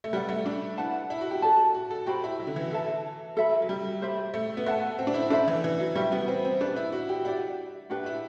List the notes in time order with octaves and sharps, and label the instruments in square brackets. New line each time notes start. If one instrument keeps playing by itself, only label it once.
[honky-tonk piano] A3
[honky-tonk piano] G3 [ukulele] B4 D5 F#5
[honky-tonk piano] A3
D4
[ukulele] E4 B4 F#5 A5
[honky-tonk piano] E4
F#4
G4
[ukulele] A4 D5 A5
[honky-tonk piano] F#4
A4
[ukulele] F#4 C5 G5 B5 [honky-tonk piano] G4
[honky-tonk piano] E4
F#3
D3
E3
[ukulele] E4 A4 E5 A5
[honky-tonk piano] F#3 [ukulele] A4 E5 B5
[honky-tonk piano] F#3
G3
[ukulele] G4 C5 E5 B5
[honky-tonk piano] A3
B3
[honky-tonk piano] A3 [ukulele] B4 F#5 A5
[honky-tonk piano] C4
D4
E4
[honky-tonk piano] D4 [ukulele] A4 C5 E5 B5
[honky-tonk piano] E3
E3
F#3
[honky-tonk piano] G3 [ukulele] F#4 C5 E5 G5
[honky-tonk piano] B3
C4
C4
[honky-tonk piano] D4 [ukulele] G4 B4 D5
[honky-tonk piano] E4
F#4
G4
[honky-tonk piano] E4 [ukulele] G4 D5 F#5
[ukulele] D4 F#4 B4 E5 [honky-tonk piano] G4
[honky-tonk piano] E4